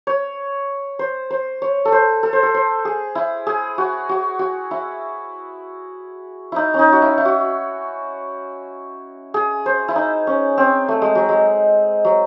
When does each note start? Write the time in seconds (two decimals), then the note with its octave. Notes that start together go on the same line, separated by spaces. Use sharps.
0.07 C#5
0.99 C5
1.30 C5
1.62 C#5
1.85 A4
1.92 C5
2.23 A4
2.33 C5
2.43 A4
2.54 C5
2.85 G#4
3.15 E4
3.47 G#4
3.78 F#4
4.09 F#4
4.39 F#4
4.71 E4
6.52 D#4 E4
6.74 C#4 D#4
6.92 F#4
7.02 E4
7.18 E4
7.25 F#4
9.34 G#4
9.66 C5
9.88 E4
9.96 D#4
10.27 C#4
10.57 C4
10.89 A3
11.02 G#3
11.15 F#3
11.29 G#3
12.05 F#3